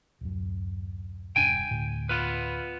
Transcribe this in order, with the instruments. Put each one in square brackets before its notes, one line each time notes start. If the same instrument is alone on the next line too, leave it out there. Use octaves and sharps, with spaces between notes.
[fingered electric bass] D1 F#2
[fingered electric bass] E1 G2 D4 [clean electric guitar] G5 G#5
[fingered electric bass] D2 A2
[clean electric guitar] B3 F4 B4